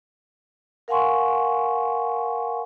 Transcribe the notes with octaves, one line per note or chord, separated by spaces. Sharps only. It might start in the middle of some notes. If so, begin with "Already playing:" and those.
A#4 F5 F#5 G#5 C6 C#6